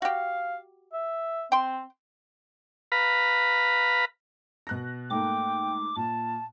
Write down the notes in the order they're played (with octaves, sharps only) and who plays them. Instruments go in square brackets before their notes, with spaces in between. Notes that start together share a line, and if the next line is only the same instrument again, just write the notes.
[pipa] F#4 G4 [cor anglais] F5
[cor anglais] E5
[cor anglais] C4 [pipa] G5 C6
[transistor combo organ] B4 F5 A#5 B5
[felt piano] B2 F#6 A#6
[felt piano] G#2 A3 A#3 [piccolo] G5 [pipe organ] D6
[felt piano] A#2 [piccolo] A5